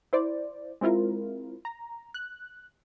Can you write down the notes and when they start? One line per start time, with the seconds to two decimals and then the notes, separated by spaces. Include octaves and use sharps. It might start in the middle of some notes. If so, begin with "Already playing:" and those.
0.13 E4 C5 D5
0.81 G#3 C4 E4 F4 A#4
1.65 A#5
2.14 F#6